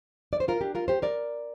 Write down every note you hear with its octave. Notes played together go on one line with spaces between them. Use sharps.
D5
C5
F4 A#4
D4 G4
F4 A#4
G4 C5
A#4 D5